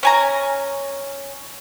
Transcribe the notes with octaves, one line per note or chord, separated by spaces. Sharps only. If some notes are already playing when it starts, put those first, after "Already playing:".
C#4 G#5 A#5